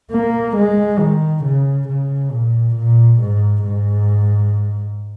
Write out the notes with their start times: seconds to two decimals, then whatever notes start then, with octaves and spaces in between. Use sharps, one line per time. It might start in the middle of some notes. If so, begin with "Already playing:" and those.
0.11 A#3
0.57 G#3
0.99 D#3
1.44 C#3
1.89 C#3
2.31 A#2
2.76 A#2
3.21 G#2
3.64 G#2